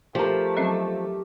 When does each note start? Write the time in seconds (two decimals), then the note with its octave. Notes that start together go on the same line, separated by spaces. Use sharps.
0.15 F3 A3 G4 A#4
0.57 F#3 C4 C#4 E5